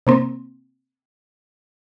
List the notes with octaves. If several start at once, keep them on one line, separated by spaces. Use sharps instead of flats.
C3 A#3 C4